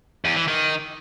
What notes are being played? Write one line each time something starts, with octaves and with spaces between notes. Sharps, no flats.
E2
E3
D#3